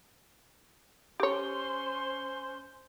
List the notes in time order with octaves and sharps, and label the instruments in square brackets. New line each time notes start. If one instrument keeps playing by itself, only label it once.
[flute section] C#4 C5 C6 [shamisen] G4 C#5